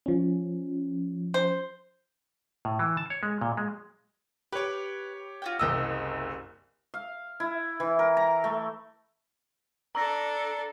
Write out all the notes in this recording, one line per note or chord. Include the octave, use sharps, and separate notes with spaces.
F3 C#4
C5
A2
E3
A5
C#5
G#3
A#2
G#3
G4 B4 C#5 G5
F4 F#4 G5
F#1 C2 D#5 G5 C6 E6
F5
E4
E3
A#4
A#5
A3
D4 A4 A#5 E6 A#6